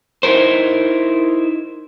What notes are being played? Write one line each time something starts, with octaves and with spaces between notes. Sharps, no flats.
D#4 E4 A4 A#4 C5